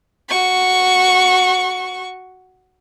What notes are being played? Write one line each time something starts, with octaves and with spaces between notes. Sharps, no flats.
F#4 C#6